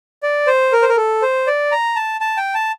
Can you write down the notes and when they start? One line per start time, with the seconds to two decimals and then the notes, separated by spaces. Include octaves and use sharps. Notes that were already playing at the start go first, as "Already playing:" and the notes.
0.23 D5
0.47 C5
0.72 A#4
0.82 C5
0.89 A#4
0.97 A4
1.22 C5
1.47 D5
1.72 A#5
1.96 A5
2.21 A5
2.37 G5
2.54 A5